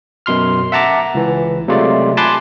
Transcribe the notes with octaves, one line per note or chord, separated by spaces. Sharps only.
F#2 B2 C6 F6
E5 F#5 A5 A#5 D6
C#2 E3
C3 F#3 G#3 A3 F4 D5
G#5 A5 B5 C6 D6 F#6